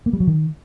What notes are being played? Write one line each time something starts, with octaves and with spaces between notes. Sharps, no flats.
A#3
G3
F#3
D#3